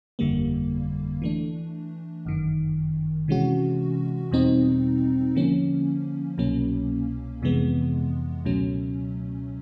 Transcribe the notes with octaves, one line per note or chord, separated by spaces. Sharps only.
G1 F2 D3 G3 A#3
E3 A3 D4
G1 F#2 D#3
C3 E3 G#3 C#4 F#4
E2 B2 G3 C4 D#4
D3 F3 A#3 C#4
C2 B2 F#3 A#3 C#4
F2 C3 E3 G#3 B3
C#2 B2 F#3 A3 C#4